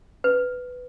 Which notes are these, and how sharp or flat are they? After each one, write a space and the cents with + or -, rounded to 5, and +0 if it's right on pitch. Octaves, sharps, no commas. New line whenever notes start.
B4 +10